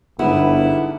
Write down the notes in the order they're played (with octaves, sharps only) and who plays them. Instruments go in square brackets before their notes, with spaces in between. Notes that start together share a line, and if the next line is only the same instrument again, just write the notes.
[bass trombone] G1 [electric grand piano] G#2 D3 [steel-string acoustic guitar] B3 [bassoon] E4